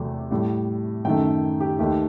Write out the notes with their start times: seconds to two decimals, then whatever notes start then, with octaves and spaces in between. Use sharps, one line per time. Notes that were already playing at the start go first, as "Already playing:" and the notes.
Already playing: E2 C3 F#3 A3
0.31 A2 G3
1.05 F#2 D#3 A3 G5
1.60 G4
1.79 D#2 D#3 A3 G4